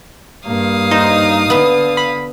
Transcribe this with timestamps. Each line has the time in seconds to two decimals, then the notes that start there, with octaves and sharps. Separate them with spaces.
0.46 G2 A#3 F5 D#6
0.91 D#4 C5
1.50 D3 B3 B4
1.97 B5